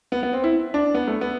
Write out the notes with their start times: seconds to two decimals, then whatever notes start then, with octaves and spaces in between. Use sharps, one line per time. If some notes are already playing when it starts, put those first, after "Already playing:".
0.12 B3
0.23 B3
0.33 C4
0.44 E4
0.74 D4
0.95 B3
1.08 A3
1.21 B3